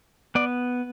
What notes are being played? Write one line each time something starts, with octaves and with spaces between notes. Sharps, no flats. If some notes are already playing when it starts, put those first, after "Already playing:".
B3 D5